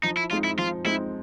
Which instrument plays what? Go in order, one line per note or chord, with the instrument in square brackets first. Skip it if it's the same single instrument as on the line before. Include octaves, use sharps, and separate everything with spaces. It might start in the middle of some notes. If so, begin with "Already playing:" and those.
[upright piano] F3 [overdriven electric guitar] D#4
[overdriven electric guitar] E4
[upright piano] G#3 C4 D#4 [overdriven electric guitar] F4
[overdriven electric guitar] E4
[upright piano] F3 [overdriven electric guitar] F4
[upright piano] G#3 C4 D#4 [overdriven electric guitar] E4